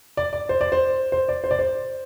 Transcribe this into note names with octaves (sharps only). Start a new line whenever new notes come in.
D5
D5
C5
D5
C5
C5
D5
C5
D5
C5